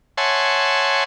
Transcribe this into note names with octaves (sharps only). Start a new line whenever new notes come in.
C#5 E5 F#5 G#5 A5 C6